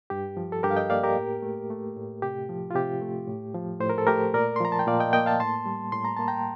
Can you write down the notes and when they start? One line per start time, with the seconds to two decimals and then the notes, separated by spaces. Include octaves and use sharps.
0.10 G2 G4
0.37 F3
0.52 A4
0.63 G2 G4 A#4
0.71 F5
0.77 D#5 G5
0.90 A#3 D5 F5
1.04 G4 A#4
1.17 A2
1.42 A3
1.70 A3
1.97 A2
2.22 C3 G4
2.49 F3
2.71 F4
2.75 C3 G4
3.02 A3
3.28 A2
3.55 F3
3.81 A2 C5
3.90 A#4
3.98 A4
4.07 A3 G4 A#4
4.34 A#2 A#4 D5
4.56 C6
4.60 F3 A#5
4.72 A5
4.79 G5
4.87 A#2 D5 F5
5.00 D#5 G5
5.13 A#3 D#5 G5
5.26 F5 A5
5.40 A2 A5 C6
5.66 G3
5.92 A2 C6
6.05 A#5
6.17 A#3 A5
6.28 G5 A#5